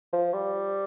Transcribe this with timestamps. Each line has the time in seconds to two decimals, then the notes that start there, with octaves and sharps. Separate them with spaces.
0.13 F3
0.34 G3